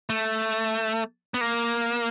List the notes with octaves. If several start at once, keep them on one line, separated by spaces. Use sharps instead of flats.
A3
B3
A#3